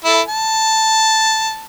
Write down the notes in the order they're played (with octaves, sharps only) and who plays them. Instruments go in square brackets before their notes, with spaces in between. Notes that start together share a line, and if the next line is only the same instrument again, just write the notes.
[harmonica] E4 A4
A5